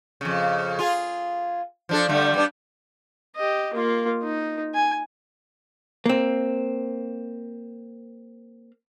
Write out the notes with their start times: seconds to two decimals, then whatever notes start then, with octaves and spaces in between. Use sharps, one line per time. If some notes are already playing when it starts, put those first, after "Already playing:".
0.21 F2 C#3
0.79 F4 G#4
1.89 F3 D4 A4
2.08 D3 G3 A3
2.34 G3 B3 D4
3.36 G4 D#5
3.74 A#3 F4
4.23 D#4
4.75 G#5
6.06 A#3 C4